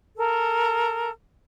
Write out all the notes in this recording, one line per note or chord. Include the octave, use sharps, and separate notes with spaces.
A4 A#4